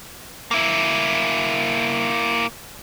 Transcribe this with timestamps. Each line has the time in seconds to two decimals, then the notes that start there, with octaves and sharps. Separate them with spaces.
0.51 A#3 E4